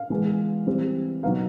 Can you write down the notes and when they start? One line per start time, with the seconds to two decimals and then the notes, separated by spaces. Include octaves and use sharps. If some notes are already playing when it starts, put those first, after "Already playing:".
Already playing: F5
0.10 E3 G#3 B3
0.67 E3 G3 C4
1.23 B2 F#3 B3 D#4 F5